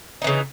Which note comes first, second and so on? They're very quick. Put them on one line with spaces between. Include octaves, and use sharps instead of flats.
D#4 E3 C#3